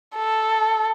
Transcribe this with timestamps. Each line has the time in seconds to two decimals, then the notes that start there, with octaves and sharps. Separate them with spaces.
0.17 A4